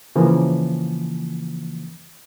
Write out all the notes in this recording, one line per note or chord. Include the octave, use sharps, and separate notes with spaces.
C#3 E3 F3 A#3